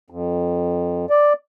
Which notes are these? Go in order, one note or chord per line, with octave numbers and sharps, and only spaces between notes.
F2
D5